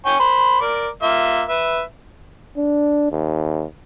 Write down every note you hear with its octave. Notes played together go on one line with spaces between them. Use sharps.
C#5 G5 G#5
C5 B5
A#4 D5
A#3 F4 E5
B4 E5
D4
D#2